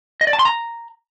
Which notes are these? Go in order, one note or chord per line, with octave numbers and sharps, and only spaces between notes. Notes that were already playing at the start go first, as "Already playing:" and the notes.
D#5
D5
A5
C6
A#5